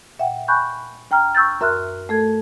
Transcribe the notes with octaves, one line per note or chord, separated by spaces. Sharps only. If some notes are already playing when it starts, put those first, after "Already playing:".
A#2 E5 F#5 G5
G#5 B5 C#6 F#6 G6
D2 G5 A#5 F6
C#6 E6 G6 A6
F#2 A#4 E5 C6 F6 F#6
A3 A4 G#6